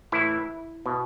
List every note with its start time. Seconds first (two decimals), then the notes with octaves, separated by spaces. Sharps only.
0.12 A2 E3 E4
0.86 B2